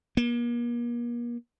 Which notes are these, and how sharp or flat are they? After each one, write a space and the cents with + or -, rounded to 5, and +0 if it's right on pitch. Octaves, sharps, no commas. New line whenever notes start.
A#3 +40